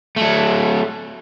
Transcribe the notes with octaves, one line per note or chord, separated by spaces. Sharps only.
F#3 A3